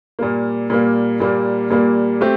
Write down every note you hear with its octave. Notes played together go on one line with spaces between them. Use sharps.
A#2 G3 A#3
A#2 G3 A#3
A#2 G3 A#3
A#2 G3 A#3
A3 C4 G4